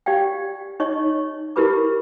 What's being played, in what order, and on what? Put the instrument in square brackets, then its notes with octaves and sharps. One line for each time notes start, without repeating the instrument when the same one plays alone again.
[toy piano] G4 D5 F5 G5
D#4 C#5 D#5 C#6
E4 G4 A#4 B4 B5 D6